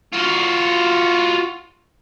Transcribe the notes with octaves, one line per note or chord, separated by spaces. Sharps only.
F4 F#4